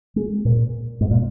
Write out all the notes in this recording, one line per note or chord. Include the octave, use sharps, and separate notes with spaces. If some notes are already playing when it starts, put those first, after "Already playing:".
G#3
A#2
G#2
A#2